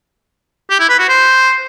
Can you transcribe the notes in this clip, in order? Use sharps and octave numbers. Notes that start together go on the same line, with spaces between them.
G4
E4
B4
F#4
C5